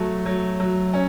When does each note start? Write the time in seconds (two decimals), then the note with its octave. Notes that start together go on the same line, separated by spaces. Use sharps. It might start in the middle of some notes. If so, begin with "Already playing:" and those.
Already playing: F#3 A3
0.26 F#3
0.60 F#3
0.93 C#4